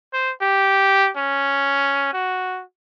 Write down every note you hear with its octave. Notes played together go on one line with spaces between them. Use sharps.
C5
G4
C#4
F#4